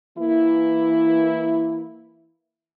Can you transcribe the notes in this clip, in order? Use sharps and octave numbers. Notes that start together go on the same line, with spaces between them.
E3 A#3 E4